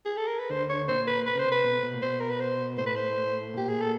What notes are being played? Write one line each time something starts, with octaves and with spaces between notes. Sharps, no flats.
G#4
A4
A#4
B4
D2 D3 C5
C#5
A#2 C5
B4
B4
C#3 C5
C3
B4
B2
B2
A#2
B2 C5
A#4
B4
C5
A2 C5
B4
C5
A#2 G4
G#4
A4